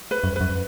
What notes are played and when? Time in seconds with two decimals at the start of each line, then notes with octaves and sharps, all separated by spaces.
0.11 B4
0.24 F#2
0.36 B4
0.41 F#2